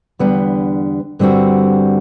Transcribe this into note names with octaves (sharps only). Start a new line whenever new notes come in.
E2 D3 G3 B3 D4
G2 D3 G3 C4 F#4